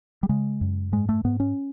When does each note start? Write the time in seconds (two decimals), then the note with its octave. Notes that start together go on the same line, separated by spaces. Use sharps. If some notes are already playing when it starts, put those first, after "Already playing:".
0.23 G3
0.29 C#3 G#3
0.61 F#2
0.92 G#2 G#3
1.09 A3
1.24 G#2 B3
1.40 C#4